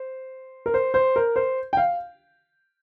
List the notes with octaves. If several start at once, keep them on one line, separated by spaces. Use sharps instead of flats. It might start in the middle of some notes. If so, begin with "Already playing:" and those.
Already playing: C5
A#4
C5
C5
A#4
C5
G5
F5